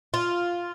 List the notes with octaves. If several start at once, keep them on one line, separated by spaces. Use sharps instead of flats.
F4